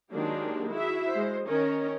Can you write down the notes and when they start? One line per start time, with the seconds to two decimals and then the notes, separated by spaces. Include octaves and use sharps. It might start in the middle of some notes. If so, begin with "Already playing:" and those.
0.13 D#3 F#3 G#3 A#3 D4 G4
0.73 E4 F#4 G#4 E5
1.12 G#3 C5
1.48 D#3 C#4 A#4 C#5 D#5